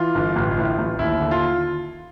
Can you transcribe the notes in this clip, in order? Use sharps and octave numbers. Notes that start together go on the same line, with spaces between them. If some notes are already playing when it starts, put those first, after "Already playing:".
Already playing: E3 F4
G1
A1
A2
A1
D#2 E4
D3
F4